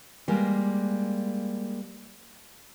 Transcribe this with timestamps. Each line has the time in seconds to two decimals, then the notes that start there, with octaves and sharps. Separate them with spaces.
0.28 G3 G#3 A#3